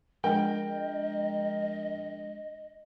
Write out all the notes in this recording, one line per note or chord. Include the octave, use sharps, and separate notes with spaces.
F3 G#3 D4 A#4 D#5 G5